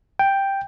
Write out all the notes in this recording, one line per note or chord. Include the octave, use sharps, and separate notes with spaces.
G5